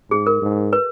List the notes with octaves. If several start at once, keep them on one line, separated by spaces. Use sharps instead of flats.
G#2 G#4
A#4
G#2
B4